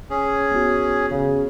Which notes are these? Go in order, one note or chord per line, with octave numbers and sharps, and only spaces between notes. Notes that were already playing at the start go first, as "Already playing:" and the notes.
C#4 G#4
B3 F#4
C#3